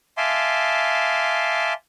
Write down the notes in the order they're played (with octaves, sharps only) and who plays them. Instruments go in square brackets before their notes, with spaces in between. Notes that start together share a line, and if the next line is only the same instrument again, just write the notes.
[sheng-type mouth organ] E5 F5 G#5 A5 C6 D6